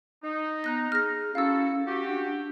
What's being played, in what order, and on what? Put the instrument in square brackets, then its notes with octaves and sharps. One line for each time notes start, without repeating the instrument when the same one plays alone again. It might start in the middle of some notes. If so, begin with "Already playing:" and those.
[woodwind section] D#4
[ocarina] B3 [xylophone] A#5 F#6 A#6
[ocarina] G#4 [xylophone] F6 A#6
[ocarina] C#4 [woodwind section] E4 F#4 A4 [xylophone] F5 E6
[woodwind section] F#4 G4
[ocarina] D4